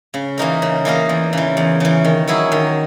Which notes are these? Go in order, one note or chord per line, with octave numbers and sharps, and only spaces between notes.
C#3
E3 A#3 D#4 A#4
C#3
E3 A#3 D#4 A#4
E2
C#3 E3
E2
C#3 E3
D#3
F#3 C#4 E4 G#4
D#3